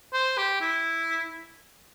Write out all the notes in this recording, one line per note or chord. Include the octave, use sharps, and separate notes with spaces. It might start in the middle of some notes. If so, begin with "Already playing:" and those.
C5
G4
E4